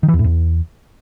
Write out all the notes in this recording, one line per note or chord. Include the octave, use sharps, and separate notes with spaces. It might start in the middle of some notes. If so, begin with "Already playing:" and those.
D#3
E3
E2
A2
E2